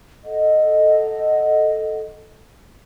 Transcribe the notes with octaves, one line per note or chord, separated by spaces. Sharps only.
A4 D#5 F#5